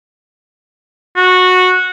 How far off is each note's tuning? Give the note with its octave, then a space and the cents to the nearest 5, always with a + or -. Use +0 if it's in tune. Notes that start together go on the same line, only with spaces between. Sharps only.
F#4 -15